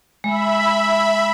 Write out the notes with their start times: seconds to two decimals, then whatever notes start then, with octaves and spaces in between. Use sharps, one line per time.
0.24 G#3 E5 B5